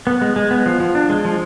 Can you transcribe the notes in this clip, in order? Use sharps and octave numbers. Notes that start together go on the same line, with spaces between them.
B3
G#3
G#3
B3
F3
F3
D4
G#3
F3